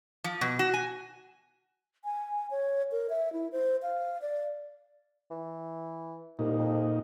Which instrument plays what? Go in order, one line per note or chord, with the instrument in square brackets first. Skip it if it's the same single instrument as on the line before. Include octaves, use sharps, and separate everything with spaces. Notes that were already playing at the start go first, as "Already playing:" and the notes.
[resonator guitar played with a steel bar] F3
B2
F#4
G#5
[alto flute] G#5
C#5
A#4
E5
E4
C5
F5
D5
[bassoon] E3
[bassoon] C2 [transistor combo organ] A#2 D#4
[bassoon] F2